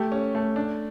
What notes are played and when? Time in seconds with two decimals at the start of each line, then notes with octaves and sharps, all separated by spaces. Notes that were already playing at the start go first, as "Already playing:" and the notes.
Already playing: A3 G4
0.12 C#4
0.35 A3
0.56 D4